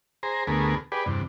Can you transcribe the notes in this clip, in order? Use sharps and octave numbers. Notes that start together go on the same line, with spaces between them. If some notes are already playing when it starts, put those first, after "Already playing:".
G#4 C5 A#5
D2 A3 B3 G#4 A#4
G4 G#4 B4 D5
E2 G2 C3